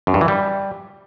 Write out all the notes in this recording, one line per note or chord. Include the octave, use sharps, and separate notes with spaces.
F#2
G2
E3
G3